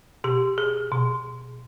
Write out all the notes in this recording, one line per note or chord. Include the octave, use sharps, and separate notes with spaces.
B2 G4
G#4
B2